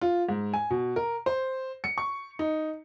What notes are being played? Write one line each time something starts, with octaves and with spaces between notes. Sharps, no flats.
F4
G#2
G#5
B2
A#4
C5
C#7
C#6
D#4